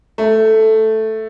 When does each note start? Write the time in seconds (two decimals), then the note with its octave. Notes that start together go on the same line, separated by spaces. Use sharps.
0.18 A3